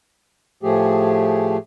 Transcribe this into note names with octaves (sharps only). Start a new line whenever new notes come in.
A2 F3 A3 G4 G#4